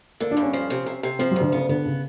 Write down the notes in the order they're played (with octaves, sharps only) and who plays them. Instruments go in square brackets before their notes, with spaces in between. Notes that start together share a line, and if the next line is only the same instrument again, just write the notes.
[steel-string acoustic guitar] D3 [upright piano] A#3
[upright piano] D4
[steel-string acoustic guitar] G2
[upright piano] C#4
[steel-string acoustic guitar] F3
C3
C3
C3
[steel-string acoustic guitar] F3 [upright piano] C4
[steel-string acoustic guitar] D2 [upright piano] F#3
[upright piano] D3
[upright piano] C#3 [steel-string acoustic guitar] B3
[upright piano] D3 [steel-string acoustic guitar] B3
[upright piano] C#3